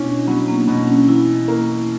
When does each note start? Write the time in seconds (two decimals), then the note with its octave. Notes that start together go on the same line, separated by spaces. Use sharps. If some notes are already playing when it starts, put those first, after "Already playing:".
Already playing: B2 C#4 D4 E4
0.27 F#3 B3
0.48 A#3
0.68 B2 B3
0.87 C#4
1.08 E3 E4
1.48 A#3